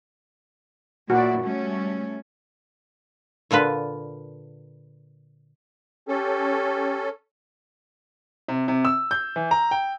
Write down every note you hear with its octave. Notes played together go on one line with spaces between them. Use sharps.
A#2 E4 F#4 D5
G3 A3 C#4
A#2 D3 F4 B4
C#4 G4 A4
C3
C3
E6
G6
E3
A#5
G5